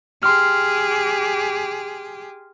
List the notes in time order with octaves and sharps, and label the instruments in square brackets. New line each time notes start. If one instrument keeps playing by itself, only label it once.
[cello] G4 G#4 [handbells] C6 F6